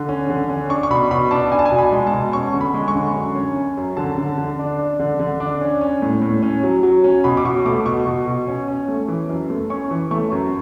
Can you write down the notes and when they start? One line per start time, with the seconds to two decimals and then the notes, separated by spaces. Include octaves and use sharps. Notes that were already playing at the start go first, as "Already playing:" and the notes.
Already playing: D3
0.09 C#4
0.30 D3
0.49 C#4
0.70 D4 C#6
0.83 C#6
0.90 B2 B5
1.11 B2 B5
1.31 D4 A5
1.52 D4 G#5
1.59 A5
1.65 G#5
1.72 B2
1.79 B5
1.92 G#3
2.07 A5
2.13 B2
2.33 C#4 C#6
2.54 D3
2.61 B5
2.74 G#3
2.88 C#6
2.95 D3
3.15 F#2
3.35 C#4
3.56 C#4
3.77 F#2
3.97 D3 A5
4.18 D3
4.38 D3
4.59 D4
4.79 D4
4.99 D3
5.19 D3
5.40 D4
5.61 C#4
5.81 C#4
6.02 A2
6.22 A2
6.43 C#4
6.63 F#3
6.83 F#3
7.04 C#4
7.24 B2 B5
7.37 D6
7.45 B2 C#6
7.66 A3 D6
7.86 B2 C#6
8.07 B2
8.27 B2
8.47 C#4
8.68 C#4
8.88 A3
9.08 E3
9.29 F#2
9.50 A3
9.70 C#4 C#6
9.91 E3
10.11 A3 C#6
10.32 F#2